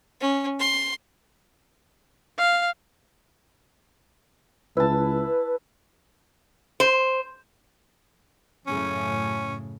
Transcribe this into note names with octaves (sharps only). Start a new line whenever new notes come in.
C#4
C6
F5
C#2 E4 B4 A5
C5
F#2 A2 C#3 C#4